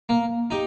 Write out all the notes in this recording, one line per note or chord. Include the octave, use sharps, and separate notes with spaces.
A#3
D#4 G4